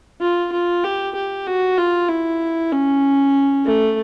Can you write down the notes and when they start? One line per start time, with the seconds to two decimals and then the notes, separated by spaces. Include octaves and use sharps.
0.21 F4
0.52 F4
0.84 G4
1.15 G4
1.47 F#4
1.78 F4
2.09 E4
2.72 C#4
3.65 A3